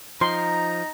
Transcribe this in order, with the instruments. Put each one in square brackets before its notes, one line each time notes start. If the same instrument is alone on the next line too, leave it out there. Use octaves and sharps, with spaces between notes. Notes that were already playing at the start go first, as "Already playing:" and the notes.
[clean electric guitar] F3 [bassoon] D#4 [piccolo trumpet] A#5 [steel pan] C6